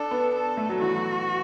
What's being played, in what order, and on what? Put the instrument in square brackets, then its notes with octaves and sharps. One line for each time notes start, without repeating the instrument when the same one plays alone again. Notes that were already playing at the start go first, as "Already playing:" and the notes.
Already playing: [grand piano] D4 [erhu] A4
[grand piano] B3
[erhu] A4
[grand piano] A3
F#3
[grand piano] E3 [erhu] F#4
[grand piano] F#3